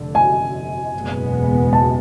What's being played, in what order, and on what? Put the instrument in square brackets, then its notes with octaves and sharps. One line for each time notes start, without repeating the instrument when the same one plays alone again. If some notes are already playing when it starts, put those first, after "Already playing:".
Already playing: [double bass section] F1 F2 D3
[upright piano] G#5
[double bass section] F#1 E2 B2 G#3 B3
[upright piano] A5